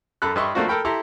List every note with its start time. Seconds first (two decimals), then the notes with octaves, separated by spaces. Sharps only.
0.22 F#2 A4 B5 F#6
0.36 G2 B4 D#5 E5 C6 C#6
0.55 F3 A3 A#3 C4 D4 F#4
0.68 A4 A#4 G5 B5
0.85 E4 G4 A4 A#5 C6